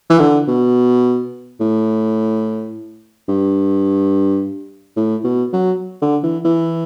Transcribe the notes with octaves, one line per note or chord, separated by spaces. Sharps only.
E3
D3
B2
A2
G2
A2
B2
F#3
D3
E3
E3